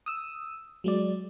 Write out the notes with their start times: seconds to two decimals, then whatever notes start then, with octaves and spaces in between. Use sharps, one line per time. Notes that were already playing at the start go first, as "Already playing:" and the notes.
0.06 D#6 E6
0.84 F#3 G#3 D5